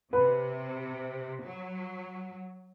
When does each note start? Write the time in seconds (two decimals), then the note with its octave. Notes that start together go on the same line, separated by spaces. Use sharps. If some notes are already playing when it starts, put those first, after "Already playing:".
0.13 C3 B4
1.43 F#3